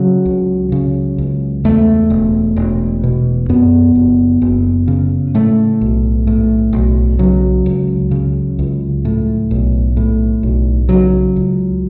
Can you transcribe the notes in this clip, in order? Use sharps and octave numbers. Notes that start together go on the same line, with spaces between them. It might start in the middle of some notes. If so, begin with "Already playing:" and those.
Already playing: C#3 F#3
C#2
C#3
C#2
E2 A3
E1
E1
B2
F#2 B3
F#1
F#1
C#3
A2 A3
B1
A2
B1
C#3 F#3
C#2
C#3
C#2
A2
B1
A2
B1
C#3 F#3
C#2